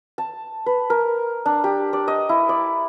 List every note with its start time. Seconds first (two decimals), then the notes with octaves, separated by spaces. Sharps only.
0.18 A5
0.66 B4
0.90 A#4
1.46 D4
1.64 G4
1.93 D5
2.08 D#5
2.29 E4
2.49 D5